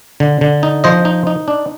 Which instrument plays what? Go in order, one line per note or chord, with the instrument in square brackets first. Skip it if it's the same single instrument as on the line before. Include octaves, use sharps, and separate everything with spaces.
[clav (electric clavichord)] D3
D3
D#4
F3 C5 D#5
D#4
D#4
D4